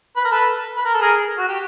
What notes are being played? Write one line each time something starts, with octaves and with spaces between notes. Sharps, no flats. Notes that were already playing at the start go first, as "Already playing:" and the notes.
B4
A#4
A4 B4
B4
A#4
A4
G#4 A#4
F#4
G4